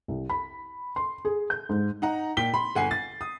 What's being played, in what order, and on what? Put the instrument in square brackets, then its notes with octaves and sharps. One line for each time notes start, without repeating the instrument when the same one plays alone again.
[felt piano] C2
B5
C6
G#4
G6
G#2
[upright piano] D#4 F#5 A#5
A#2 G5 B6 G7
B5 C6
G1 F#5 G#5 C7
A6
D#6